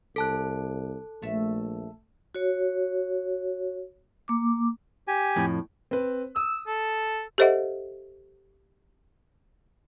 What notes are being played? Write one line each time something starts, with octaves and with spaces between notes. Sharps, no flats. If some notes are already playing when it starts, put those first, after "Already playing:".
C2 A4 A5 F#6
A#1 A3 E5
F#4 C#5
A#3 D6
G4 G#5
F2 A2
C4 B4
D#6 E6
A4
G4 A4 C5 D#5 E5 F#5